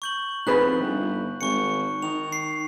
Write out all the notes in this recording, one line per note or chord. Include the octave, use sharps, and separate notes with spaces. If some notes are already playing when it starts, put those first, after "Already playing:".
C#6 G6 F#7
F2 D#4 G#4 B4 F#6
G1
G#1 C#6 C#7
D#3 F7
C7